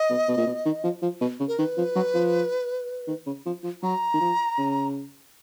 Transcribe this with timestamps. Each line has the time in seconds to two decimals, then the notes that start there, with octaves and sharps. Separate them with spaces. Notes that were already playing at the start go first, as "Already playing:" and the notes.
Already playing: D#5
0.10 B2
0.28 B2
0.37 A#2
0.46 B2
0.65 D#3
0.84 F3
1.02 F3
1.21 B2
1.40 C#3
1.48 A#4
1.58 D#3 B4
1.78 F3
1.96 F#3
2.14 F3
3.07 D#3
3.26 C#3
3.46 F3
3.64 F3
3.83 F#3 A#5
4.14 D#3
4.21 F3
4.58 C#3